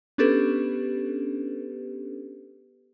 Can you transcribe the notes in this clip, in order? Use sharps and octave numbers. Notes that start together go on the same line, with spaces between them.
B3 C#4 D4 G4 A4 B4